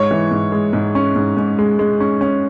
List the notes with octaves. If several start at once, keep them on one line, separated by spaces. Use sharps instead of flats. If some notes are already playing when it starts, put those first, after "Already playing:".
Already playing: G#2 C#5
E3
G#2
G#3
G#2
C#4
G#2
G#2
G#3
G#3
C#4
C#4